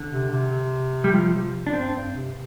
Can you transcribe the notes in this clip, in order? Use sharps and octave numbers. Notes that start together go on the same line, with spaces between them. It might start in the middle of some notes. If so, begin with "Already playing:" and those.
Already playing: D3
C3
C3
G3
F3
D4
G2 C4
G2
C3